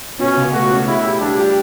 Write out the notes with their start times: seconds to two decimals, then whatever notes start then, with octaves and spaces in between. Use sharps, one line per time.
0.19 B2 C#4
0.36 C#2
0.53 A3 F#4
0.70 C#4
0.87 C#3 E4
1.04 G4
1.20 G3 D4
1.38 G4